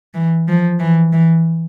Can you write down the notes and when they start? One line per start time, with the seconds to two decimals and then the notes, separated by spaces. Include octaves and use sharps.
0.14 E3
0.48 F3
0.80 E3
1.13 E3